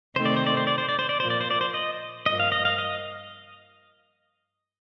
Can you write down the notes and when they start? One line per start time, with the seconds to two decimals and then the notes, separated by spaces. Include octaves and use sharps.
0.15 C3 D#3 A3 C4 D#4 C5
0.25 D5
0.37 C5
0.47 D5
0.57 C5
0.67 D5
0.78 C5
0.89 D5
0.99 C5
1.09 D5
1.20 A#2 F3 A#3 C5
1.30 D5
1.41 C5
1.51 D5
1.61 C5
1.74 D#5
2.26 G2 F3 A#3 D#5
2.40 F5
2.52 D#5
2.65 F5
2.78 D#5